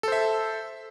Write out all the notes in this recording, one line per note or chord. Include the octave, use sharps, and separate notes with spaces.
A4 C5 E5